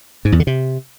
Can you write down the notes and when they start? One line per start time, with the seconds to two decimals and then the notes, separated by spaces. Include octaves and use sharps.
0.25 G#2
0.32 E2
0.40 D3
0.47 C3